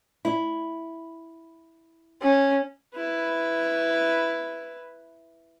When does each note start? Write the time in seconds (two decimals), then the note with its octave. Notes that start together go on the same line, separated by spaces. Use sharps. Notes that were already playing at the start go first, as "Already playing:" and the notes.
0.25 E4
2.23 C#4
2.95 E4 B4